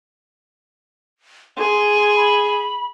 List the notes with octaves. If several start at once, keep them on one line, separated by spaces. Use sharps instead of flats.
G#4 C6
B5